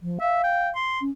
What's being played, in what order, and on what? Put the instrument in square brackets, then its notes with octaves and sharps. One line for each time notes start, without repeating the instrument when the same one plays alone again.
[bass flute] F3
[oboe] E5 [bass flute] F5
[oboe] G5
C6
[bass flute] C#4